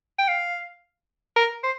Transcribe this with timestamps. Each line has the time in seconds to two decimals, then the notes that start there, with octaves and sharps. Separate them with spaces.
0.18 G5
0.28 F5
1.36 A#4
1.63 C5